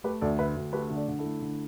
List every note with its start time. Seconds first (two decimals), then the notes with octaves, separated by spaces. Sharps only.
0.04 A3 G4 B4
0.21 D2 A4 D5
0.39 D3 B4 E5
0.57 D2
0.73 A3 G4 B4
0.90 D3
0.95 A4 D5
1.08 D3
1.19 E4 A4
1.25 A3
1.42 D3